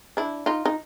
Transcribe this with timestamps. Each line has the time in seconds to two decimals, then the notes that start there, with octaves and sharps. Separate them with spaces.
0.17 D4 E4
0.46 D#4 F4
0.66 D#4